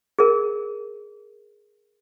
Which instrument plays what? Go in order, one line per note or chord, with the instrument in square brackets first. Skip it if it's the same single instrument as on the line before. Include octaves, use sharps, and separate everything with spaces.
[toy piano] G#4 A#4